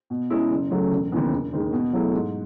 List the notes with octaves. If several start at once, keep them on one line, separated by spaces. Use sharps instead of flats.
B2
G#3 C#4 E4 G#4
F#1
F#2 C#3 F#3 A3
E1
D#2 C#3 E3 B3
E1
D#2 D#3 G#3
B2
F#3 A3 E4 G#4
G#2